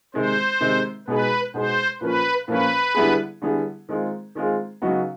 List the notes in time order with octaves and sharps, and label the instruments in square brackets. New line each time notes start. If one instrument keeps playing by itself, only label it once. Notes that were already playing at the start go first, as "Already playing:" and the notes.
[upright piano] C3 D#3 G#3 C4 [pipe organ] C5
[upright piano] C3 D#3 G#3 C4
[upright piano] B2 G#3 B3 D#4 G#4 [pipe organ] B4
[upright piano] B2 G#3 B3 D#4 G#4 [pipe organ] C5
[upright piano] A#2 F3 A#3 C#4 [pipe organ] B4
[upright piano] A#2 F3 A#3 C#4 [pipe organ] B4
[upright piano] D3 G3 B3 E4 G#4
D3 G3 B3 E4 G#4
D#3 G#3 C4 F4 G#4
D#3 G#3 C4 F4 G#4
C#3 F#3 B3 D#4 F#4